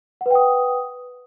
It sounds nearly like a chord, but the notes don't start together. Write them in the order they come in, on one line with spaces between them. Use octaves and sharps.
F#5 B4 G5 D#6